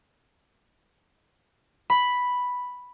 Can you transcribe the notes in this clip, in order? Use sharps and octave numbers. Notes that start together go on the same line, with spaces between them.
B5